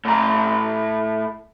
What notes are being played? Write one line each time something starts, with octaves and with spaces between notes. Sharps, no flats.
A2 A#5